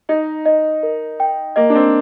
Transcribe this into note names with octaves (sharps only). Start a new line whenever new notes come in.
D#4 D#5
D#5
A#4
G5
A#3 D#5
D4
C4